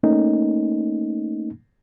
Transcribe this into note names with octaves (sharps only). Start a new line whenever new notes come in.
A3 A#3 C#4 D#4